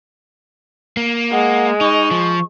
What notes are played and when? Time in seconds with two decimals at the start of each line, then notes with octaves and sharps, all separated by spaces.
0.97 A#3
1.32 G#3 F#5
1.81 D#4 C#6
2.11 F3